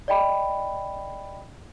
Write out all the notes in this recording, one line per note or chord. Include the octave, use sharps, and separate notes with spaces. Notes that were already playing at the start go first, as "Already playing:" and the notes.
D5 D#5 G5 B5